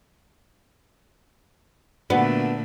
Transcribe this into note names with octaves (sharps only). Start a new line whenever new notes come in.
A#2 D3 A3 B3 D4 F#4 B4